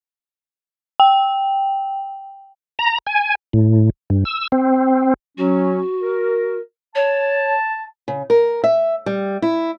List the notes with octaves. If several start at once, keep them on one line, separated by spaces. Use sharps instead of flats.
G5
A#5
G#5
A2
G2
E6
C4
F#3 C#4 F#4
A#4
C#5 A5
C#3
A#4
E5
G3
E4